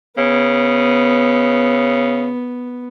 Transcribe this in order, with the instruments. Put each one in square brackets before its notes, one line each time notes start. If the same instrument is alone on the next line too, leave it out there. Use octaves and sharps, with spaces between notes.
[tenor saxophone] C#3 [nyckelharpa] B3